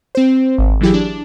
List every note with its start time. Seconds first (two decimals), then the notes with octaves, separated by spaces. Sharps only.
0.15 C4 C5
0.58 G#1
0.81 D3 E3 F#3 E4 G4 G#4
0.94 D4